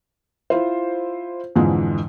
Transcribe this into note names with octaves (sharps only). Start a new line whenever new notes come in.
E4 F4 C5
F2 G#2 D3 E3 F3 G#3